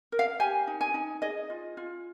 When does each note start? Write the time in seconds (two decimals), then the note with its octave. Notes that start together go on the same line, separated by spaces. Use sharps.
0.12 A#4
0.19 F5
0.40 G4 G#5
0.67 D#4
0.81 G#5
0.94 D#4
1.22 G#4 D#5
1.50 F4
1.77 F4